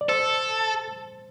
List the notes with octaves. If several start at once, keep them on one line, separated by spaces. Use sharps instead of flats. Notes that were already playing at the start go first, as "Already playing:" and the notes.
D5
A4 C5